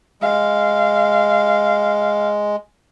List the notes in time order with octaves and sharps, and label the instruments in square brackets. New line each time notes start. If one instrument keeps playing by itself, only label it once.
[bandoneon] G#3 [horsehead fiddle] F5